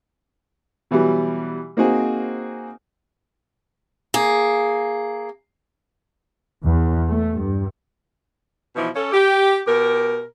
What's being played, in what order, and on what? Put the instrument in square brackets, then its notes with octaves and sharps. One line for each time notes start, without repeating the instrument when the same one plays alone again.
[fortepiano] B2 E3 F#3 G3
A#3 C4 D#4 F#4 G#4
[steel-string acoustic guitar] A#3 G#4
[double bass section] E2
A3
G2
[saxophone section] B2 E3 F3 D#4 E4
C#4 A4
G4
B2 G4 A#4